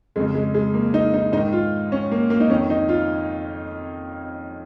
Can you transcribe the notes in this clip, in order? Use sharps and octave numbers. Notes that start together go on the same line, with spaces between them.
F2 C#3 G#3
G#3
G#3
A#3
D#4
D#4
G#2 D#3 D#4
F4
C#4
A#3
A#3
D#4
F2 D#3 C#4
D#4
F4